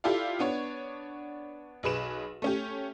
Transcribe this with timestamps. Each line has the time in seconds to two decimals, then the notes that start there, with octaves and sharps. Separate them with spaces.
0.04 E4 F4 G4 A4 D5 F5
0.39 B3 D4 C#5
1.83 B1 G#4 B4 E7
2.42 A3 C#4 G4